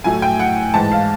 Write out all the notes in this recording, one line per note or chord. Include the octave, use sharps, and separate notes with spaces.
A2 F#3 A3 G#5
G5
F#5
G#2 E3 G#3 A5
F5